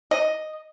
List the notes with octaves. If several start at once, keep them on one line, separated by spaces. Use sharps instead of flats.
D#5